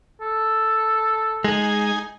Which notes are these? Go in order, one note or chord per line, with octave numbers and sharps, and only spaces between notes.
A4
G#3 D#4 G#4 G#5